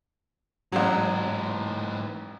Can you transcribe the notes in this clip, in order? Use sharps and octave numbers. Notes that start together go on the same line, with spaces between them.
A1 G#2 E3 F#3